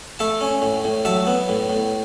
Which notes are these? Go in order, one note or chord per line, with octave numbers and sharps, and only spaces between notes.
A3 E5 A5
C#4
A2
A2
F#3 E5 A5
B3
A2
A2